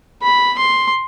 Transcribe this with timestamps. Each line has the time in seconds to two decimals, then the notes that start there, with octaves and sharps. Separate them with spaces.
0.22 B5
0.58 C6